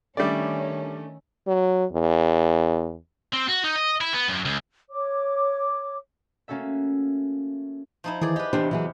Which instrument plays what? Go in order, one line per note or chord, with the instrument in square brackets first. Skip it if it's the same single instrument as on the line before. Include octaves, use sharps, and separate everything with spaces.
[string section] D#3 C#4 [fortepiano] G3 D5 [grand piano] A3 D4 E5
[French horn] F#3
E2
[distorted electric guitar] C4
F#4
D#4
D#5
E4
B3
F#2
C#2
[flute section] C#5 D6
[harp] A3 A#3 C#4 F#4 A4 E5
[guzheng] F3 D#4 E4
[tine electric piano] D#3 E3 E4 [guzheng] G#4 D5
[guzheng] G4 B4 [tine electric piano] D#5
[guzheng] E2 C3 [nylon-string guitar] D4 G4 C5
[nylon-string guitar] E3 F#3 G#4